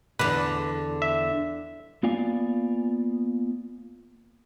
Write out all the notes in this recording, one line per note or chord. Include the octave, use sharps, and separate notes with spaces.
E2 D3 B4
E5
A#3 B3 F4 D5 F5 G#5